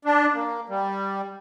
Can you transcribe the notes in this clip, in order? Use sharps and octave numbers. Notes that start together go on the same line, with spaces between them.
D4
A#3
G3